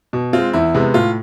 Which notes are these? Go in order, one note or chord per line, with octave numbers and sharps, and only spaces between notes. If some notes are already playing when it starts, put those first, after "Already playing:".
B2
G#3 C4 F4
E2 E4
C3 G#3 B3
A2 F4